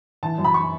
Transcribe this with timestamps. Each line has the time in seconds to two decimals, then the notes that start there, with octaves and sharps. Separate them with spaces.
0.23 E3 A5
0.38 F#2
0.44 B5
0.54 C#6